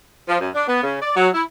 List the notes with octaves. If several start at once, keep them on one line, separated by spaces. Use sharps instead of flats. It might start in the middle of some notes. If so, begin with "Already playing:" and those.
F3
F#2
D4
B3
C#3
D5
F#3
E4